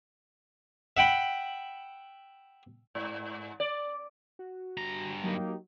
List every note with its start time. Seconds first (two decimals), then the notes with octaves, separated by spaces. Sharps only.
0.97 E5 F#5 G5 B5
2.95 G#2
3.60 D5
4.39 F#4
4.78 G2 A#5
5.24 F#3 A#3 D#4 G4